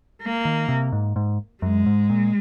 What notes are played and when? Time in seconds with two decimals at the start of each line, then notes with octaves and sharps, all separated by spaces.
0.22 A#3
0.45 D#3
0.68 C3
0.92 G#2
1.16 G#2
1.62 F#2 G#3
1.86 G#2
2.10 A#2